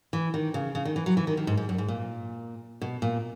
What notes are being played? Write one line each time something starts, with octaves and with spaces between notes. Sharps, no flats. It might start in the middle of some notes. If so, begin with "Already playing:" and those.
E3
D#3
C#3
C#3
D#3
E3
F#3
E3
D#3
D#3
G#2
G#2
F#2
G#2
A#2
B2
A#2